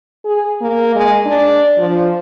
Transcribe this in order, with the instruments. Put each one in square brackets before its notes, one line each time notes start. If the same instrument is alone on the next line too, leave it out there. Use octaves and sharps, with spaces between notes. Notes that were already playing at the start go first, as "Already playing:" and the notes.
[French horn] G#4
A#3
G#3
D4
F3